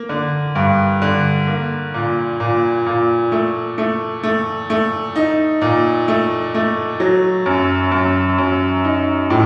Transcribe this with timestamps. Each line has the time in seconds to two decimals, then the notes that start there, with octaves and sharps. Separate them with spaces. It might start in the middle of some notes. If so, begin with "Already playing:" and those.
Already playing: A#3
0.09 D3
0.55 G2
1.02 D3
1.47 A#3
1.94 A#2
2.40 A#2
2.86 A#2
3.32 A3
3.78 A3
4.23 A3
4.70 A3
5.16 D#4
5.61 A#2
6.08 A3
6.55 A3
7.00 F#3
7.46 F#2
7.91 F#2
8.38 F#2
8.84 D#4
9.30 A2